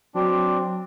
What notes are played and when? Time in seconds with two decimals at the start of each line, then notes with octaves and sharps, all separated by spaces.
0.15 F#3 C4 D4